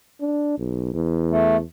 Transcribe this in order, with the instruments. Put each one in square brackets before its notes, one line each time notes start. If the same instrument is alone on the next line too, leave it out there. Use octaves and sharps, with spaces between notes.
[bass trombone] D4
B1
E2
[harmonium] A3